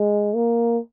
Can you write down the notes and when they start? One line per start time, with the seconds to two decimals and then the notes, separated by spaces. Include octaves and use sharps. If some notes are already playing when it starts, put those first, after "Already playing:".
Already playing: G#3
0.35 A#3